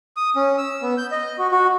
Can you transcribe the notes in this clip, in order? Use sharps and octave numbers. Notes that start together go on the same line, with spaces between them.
D#6
C#4
E6
B3
G6
D#5
F#4
F#4